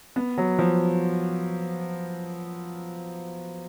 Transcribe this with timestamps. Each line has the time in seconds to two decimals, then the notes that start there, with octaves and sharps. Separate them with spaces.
0.16 B3
0.38 F#3
0.59 F3